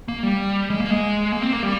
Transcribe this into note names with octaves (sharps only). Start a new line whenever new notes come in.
A#3
G3
G#3
A#3
G#3
A#3
C4
A#3
G3